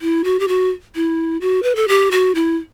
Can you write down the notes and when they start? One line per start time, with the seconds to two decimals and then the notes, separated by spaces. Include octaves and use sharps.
0.01 E4
0.24 F#4
0.39 G4
0.48 F#4
0.95 E4
1.41 F#4
1.63 B4
1.76 A4
1.88 G4
2.11 F#4
2.35 E4